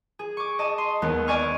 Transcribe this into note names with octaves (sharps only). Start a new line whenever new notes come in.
G#4
C#6 D6
D#5 A5 D#6
C6
D#2 G#3 B3 D#4
D5 D#5 G#5 C#6 F6